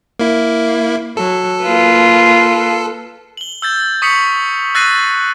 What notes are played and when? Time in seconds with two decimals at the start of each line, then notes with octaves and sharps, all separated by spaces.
0.19 A#3 E4
1.17 F#3 A4
1.63 A#3 F4 B4
3.37 F#7 G7
3.62 E6 G6 A6 G7
4.02 C#6 D#6 B6 C#7 F7 F#7
4.75 E6 F#6 A6 A#6 C7 D#7